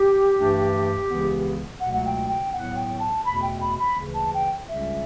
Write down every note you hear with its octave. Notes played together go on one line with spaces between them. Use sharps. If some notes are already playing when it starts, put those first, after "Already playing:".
Already playing: G4
G2 E3 A3 D4
C#2 C#3 E3 B3
C#2 B2 F#3 A3 F#5
F#5
G5
G5
A2 F#3 B3 F#5
G5
A5
E2 B2 A3 B5
G5
B5
B5
D2 C#3 E3
A5
G5
C#2 C#3 G3 C#4 E5